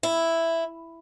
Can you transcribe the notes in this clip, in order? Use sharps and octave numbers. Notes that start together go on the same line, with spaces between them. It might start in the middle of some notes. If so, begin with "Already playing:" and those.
E4